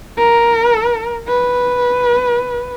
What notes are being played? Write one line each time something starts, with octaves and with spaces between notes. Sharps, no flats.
A#4
B4